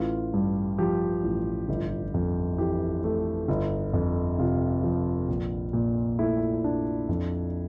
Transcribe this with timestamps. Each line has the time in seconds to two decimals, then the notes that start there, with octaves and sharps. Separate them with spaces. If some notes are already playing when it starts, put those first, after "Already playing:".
Already playing: A1 F4
0.34 G2
0.78 F3 G4
1.24 A1
1.69 G1
2.14 F2
2.58 E3 G4
3.04 A3
3.48 G1
3.94 F2
4.38 C3 F4
4.84 F3
5.28 A#1
5.73 A#2
6.19 A3 E4
6.64 D4
7.09 F2